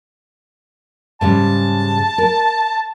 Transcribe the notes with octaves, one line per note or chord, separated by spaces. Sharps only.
G#2 C#3 G3 A5
A#4